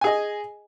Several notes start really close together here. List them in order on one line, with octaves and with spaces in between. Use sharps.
G#5 G#4 D#5